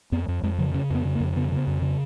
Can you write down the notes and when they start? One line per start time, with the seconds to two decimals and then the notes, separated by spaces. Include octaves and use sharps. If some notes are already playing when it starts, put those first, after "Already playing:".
0.12 F2 B3
0.28 F2
0.43 F2 G#3
0.58 C#3 F3
0.74 C#3 C#4
0.90 F2 B3
1.05 C#3
1.15 A#3
1.20 F2
1.36 C#3 B3
1.52 C#3 B3
1.67 F2
1.82 C#3